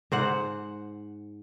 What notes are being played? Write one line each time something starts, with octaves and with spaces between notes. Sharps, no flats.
G#2 C5 F#5